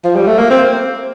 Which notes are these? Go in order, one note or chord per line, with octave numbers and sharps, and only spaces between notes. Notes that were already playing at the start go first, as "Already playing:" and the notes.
F3
G3
A3
A#3
C4